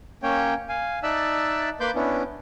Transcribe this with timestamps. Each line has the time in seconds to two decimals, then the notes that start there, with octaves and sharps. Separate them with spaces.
0.23 A#3 C#4 C#5 G5
0.69 F5 G#5
1.03 D#4 D5 E5 A5 E6 F#6
1.80 A#3 B4 B5 C6 D6 G6
1.95 B3 C#4 D4 E4